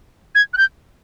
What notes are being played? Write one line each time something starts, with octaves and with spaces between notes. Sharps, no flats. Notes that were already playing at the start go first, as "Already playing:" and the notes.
G#6
F#6
G6